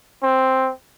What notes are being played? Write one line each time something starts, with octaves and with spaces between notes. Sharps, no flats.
C4